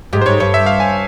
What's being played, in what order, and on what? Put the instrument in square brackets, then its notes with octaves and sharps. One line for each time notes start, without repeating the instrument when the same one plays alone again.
[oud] G#2 [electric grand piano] G4
[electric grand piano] C5
[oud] G#2 [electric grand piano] C#5
[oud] G2 [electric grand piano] C#5
[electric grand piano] E5
F5
G#5